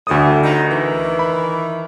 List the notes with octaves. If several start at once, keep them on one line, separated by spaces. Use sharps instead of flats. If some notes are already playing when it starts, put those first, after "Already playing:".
D2 A2 G3 A3 D#6
D#4
D#3 E3
B5